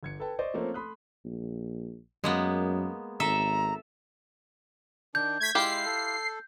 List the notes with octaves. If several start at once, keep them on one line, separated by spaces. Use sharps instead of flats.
G1 G#6 C#7
A4 B4 G5 A5
C5 D5 D#5 C#6
F3 A3 A#3 C4 C#4
A3 B5 C6 D#6 F#6
A#1
F#2 G#3 A#3 B3
G#1 A4 E5 A#5
D#3 D4 G6
A3 G#6 B6
G#3 E4 F4 G4 C7
A4